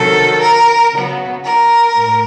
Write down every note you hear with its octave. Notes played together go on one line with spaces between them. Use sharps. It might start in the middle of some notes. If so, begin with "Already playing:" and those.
Already playing: C3 D#3 F#3 A4
A#4
C#3 F#3 B3
A#4
A2